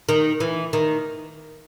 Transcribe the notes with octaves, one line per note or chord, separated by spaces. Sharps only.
D#3
E3
D#3